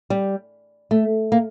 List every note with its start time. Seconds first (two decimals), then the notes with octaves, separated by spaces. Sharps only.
0.10 G3
0.91 A3
1.32 A#3